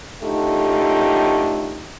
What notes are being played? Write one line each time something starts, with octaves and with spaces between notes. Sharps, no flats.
F#2 D3 A3 D#4 F4 G4